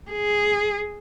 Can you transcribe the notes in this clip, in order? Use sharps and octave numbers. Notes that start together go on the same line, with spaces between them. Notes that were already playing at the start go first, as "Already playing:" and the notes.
G#4